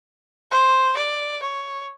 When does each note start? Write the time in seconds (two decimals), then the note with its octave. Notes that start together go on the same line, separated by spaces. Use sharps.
0.51 C5
0.97 D5
1.43 C#5